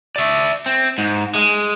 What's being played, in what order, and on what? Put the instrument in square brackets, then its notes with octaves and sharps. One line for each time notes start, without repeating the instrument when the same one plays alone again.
[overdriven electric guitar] D5 E5
C4
G#2
G#3